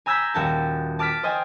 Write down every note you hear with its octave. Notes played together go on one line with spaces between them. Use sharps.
G#5 A#5 E6 G6 G#6 B6
D#1 F#4 G5 A5
A5 D6 F6 A6 B6
C5 D#5 G5 G#5